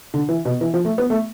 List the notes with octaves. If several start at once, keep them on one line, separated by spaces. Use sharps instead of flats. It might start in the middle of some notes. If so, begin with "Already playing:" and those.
D3
E3
B2
E3
F3
A3
B3
A3